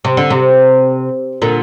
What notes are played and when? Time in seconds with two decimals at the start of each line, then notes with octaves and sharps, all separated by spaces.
0.05 C3
0.17 D3
0.30 C3
1.42 A#2 D3